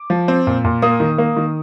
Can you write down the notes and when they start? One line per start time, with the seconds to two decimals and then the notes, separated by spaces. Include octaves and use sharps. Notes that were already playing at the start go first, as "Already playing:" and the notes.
Already playing: D6
0.10 F3
0.28 C4
0.47 A#2
0.65 A#2
0.82 A#3 D#6
1.00 D#3
1.18 A#3
1.37 D#3